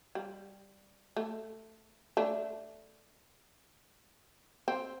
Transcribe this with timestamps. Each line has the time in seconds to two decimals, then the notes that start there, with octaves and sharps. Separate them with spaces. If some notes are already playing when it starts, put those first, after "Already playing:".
0.15 G3
1.17 A3
2.17 A3 D4
4.68 C4